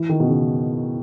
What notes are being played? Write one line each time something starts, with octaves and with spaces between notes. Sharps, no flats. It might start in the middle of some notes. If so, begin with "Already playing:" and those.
Already playing: E3
D#3
B2
C#3